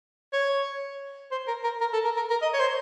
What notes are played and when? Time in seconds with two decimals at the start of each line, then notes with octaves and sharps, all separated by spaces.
0.33 C#5
1.32 C5
1.48 A#4
1.64 A#4
1.81 A#4
1.93 A4
2.04 A#4
2.17 A#4
2.30 A#4
2.42 D#5
2.53 C#5
2.60 C5